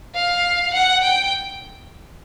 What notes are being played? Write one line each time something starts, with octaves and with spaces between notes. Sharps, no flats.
F5
F#5
G5